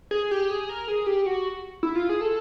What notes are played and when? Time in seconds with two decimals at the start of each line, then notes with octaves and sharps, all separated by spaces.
0.11 G#4
0.31 G4
0.50 G#4
0.69 A#4
0.88 G#4
1.06 G4
1.26 F#4
1.83 E4
1.96 F4
2.09 G#4
2.21 A4